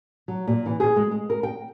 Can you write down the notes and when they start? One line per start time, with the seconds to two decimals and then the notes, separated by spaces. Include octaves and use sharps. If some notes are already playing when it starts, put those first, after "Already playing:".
0.28 F#3
0.47 A#2
0.66 E3
0.80 G#4
0.96 G#3
1.11 G#3
1.30 A#4
1.43 G5